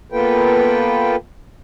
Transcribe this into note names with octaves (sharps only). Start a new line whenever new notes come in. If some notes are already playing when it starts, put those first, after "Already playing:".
A#3 B3 F4 A4 B4 G5